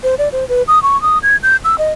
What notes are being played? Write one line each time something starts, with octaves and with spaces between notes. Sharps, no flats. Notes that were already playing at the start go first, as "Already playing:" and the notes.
C5
D5
C5
B4
D#6
C#6
D#6
G#6
G6
E6
D#5